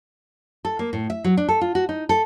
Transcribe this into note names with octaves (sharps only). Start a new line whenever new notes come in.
A4
A#3
A2
E5
F#3
D4
A4
F4
F#4
D#4
A4